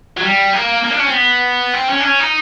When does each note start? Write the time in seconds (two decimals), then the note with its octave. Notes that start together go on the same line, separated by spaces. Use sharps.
0.17 F#3
0.23 G3
0.53 A#3
0.84 A#3
0.91 D4
0.99 C#4
1.06 C4
1.13 B3
1.73 C4
1.89 C#4
2.00 D4
2.04 C#4
2.20 D#4